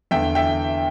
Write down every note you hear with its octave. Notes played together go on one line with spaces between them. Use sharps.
E2 D3 E5 G5
E5 G5